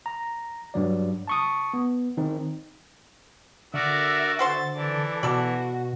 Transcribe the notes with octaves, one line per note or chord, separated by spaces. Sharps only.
A#5
G2 F#3 D5
A5 C#6 D#6
B3
D#3 C4 D#4
D3 F#4 A#4 D5 E5
F#4 C5 C6 A6
E3 A4 D5
B2 F#4 A4 D5